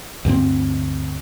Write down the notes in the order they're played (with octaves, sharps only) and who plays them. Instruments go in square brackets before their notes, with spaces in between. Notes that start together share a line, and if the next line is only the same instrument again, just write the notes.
[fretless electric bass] D2 G2 G#3 C4